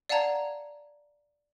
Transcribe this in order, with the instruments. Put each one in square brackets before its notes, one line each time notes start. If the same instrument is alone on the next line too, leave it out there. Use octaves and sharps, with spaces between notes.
[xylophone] D5 F5 F#5 A5 A#5 G#6